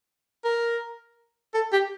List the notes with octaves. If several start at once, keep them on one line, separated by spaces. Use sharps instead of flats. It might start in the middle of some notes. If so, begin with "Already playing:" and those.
A#4
A4
G4